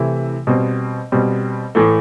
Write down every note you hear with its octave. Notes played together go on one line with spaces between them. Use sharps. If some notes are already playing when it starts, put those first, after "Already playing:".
Already playing: C3 E3 A3 E4
B2 G3 C4
B2 G3 C4
A2 E3 A3